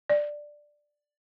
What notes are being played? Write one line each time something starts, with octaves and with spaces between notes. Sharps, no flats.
D5